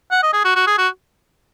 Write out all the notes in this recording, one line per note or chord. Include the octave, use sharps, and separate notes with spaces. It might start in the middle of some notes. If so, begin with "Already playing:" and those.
F#5
D#5
G#4
F#4
F#4
G#4
F#4